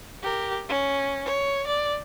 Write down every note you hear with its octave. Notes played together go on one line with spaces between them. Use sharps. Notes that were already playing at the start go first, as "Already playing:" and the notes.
G4 A#4
C#4
C#5
D5